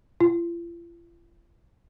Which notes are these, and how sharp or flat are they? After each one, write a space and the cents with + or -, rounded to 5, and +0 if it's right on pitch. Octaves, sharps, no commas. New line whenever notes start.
F4 -45